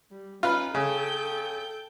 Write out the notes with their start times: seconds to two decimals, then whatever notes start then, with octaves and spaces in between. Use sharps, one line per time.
0.10 G3
0.43 C#4 D#4 F4 B4
0.75 C#3 A4 G5 G6